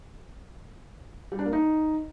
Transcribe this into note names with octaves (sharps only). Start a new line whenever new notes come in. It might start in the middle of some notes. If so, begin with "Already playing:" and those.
G3
D4
A#3
D#4